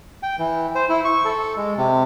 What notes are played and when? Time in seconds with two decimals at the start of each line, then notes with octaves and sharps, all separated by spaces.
0.23 G5
0.39 E3
0.75 C5
0.89 E4
1.05 C#6
1.25 A4
1.56 G#3
1.77 C3